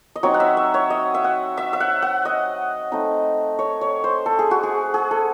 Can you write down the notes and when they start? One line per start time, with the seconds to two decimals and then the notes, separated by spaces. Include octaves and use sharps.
0.16 D#5
0.23 F#3 C4 D#4 C#5
0.34 F#5
0.40 E5
0.57 E5
0.74 C#5
0.90 D#5
1.14 E5
1.24 F#5
1.57 E5
1.73 E5
1.80 F#5
2.02 F#5
2.25 D#5
2.92 A3 C4 D#4
3.59 C#5
3.81 C#5
4.04 C5
4.26 A4
4.39 G#4
4.51 F#4
4.63 G#4
4.94 G#4
5.11 A4